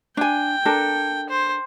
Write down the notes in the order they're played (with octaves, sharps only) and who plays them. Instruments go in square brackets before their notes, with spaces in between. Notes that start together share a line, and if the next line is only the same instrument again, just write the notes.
[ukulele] D4 G#5 [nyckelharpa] G5
[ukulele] D4 A4 A#4
[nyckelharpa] C5